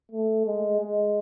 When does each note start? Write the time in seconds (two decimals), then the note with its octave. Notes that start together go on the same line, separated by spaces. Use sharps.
0.12 A3
0.46 G#3
0.80 G#3